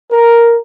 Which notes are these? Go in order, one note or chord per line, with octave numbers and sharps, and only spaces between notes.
A#4